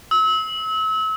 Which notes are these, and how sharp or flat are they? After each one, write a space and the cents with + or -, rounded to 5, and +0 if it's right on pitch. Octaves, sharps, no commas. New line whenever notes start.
E6 -35